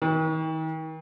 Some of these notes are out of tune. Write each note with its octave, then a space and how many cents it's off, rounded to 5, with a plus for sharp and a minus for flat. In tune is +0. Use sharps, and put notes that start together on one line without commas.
D#3 +40